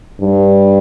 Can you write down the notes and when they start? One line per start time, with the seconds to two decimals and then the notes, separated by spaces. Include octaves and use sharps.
0.20 G2